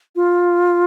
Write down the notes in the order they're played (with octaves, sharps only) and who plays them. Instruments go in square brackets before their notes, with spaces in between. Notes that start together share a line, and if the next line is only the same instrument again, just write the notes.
[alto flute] F4